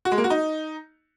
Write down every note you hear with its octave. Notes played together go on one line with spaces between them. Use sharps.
F#4
G#3
A#3
F#4
D#4